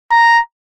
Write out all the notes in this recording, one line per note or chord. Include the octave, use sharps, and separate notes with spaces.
A#5